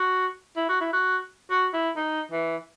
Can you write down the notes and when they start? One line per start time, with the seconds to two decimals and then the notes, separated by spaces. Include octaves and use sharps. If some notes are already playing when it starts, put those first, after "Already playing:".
Already playing: F#4
0.57 E4
0.69 F#4
0.81 E4
0.93 F#4
1.50 F#4
1.73 E4
1.96 D#4
2.32 E3